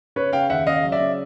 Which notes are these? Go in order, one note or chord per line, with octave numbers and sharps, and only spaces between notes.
C#3 B4 C#5
C#3 F5 G5
D#2 E5 F#5
C#3 D#5 F5
F#3
D5 E5
C#3